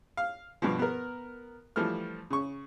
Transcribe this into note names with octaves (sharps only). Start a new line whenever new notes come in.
F5
G2 B2 F3
B3 A#4
E3 F3 G3 A3 F6
C#3 C#6